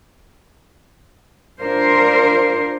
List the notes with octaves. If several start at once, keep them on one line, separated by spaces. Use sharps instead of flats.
D4 F4 A#4 C5